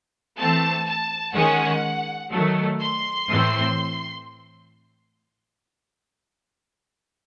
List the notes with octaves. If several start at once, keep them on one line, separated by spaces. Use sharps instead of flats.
E3 A3 C4 A5
A5
D#3 G#3 C#4 F#5
D#3 F#3 A3
C6
A2 E3 C4